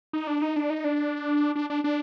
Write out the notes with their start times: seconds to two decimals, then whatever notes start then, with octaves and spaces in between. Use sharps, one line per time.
0.13 D#4
0.27 D4
0.42 D#4
0.56 D4
0.70 D#4
0.84 D4
1.55 D4
1.70 D4
1.84 D4